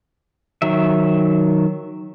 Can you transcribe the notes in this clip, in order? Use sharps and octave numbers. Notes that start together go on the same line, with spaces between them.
D#3 F#3 E5